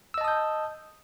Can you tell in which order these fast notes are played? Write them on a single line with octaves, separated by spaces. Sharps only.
E6 D#5 A5 D#6 G6